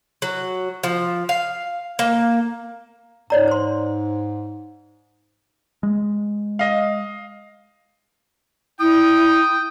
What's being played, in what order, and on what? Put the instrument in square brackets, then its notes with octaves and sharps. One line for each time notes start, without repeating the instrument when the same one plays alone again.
[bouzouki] F#3
F3
F5
A#3
[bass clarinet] G#2 [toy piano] C#5 D5 A#5
[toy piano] C5 C6
[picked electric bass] G#3
[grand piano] D#5 F5
[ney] E4 [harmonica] G5 D#6